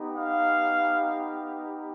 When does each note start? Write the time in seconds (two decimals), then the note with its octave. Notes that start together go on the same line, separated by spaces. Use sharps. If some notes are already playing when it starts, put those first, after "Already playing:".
Already playing: B3 D#4 G4
0.15 F5